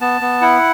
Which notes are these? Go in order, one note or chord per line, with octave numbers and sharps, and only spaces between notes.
B3 A5
B3
E4 F#5